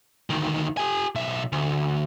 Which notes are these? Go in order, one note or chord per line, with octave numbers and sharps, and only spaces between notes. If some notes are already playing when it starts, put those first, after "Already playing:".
D2 D#3
G4 G#5
B1 E5
D2